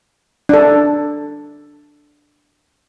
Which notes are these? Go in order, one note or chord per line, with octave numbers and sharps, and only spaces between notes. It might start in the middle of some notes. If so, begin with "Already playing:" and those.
D4 A4